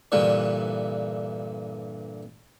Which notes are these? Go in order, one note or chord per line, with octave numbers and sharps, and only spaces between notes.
G2 A#2 D3 E3